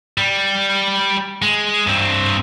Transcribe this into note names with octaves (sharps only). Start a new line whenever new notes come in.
G3
G#3
G2 C4